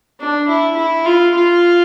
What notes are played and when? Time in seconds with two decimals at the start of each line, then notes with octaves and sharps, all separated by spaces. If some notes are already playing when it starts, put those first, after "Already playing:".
0.20 D4
0.48 E4
0.77 E4
1.06 F4
1.35 F4